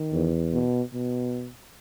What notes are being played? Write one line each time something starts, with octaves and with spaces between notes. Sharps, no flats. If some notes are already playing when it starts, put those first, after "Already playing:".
Already playing: D#3
E2
B2
B2